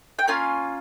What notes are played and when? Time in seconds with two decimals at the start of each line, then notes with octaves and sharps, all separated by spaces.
0.19 G5
0.28 A#3 C#4 F4 G#5